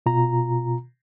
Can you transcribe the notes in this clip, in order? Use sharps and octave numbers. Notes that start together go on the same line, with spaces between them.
B2 F4 A#5